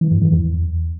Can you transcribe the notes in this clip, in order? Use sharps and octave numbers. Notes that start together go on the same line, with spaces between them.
E3
G2
E3
E2